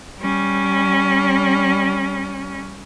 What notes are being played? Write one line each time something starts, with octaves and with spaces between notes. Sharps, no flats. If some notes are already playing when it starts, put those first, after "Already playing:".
G3 C#4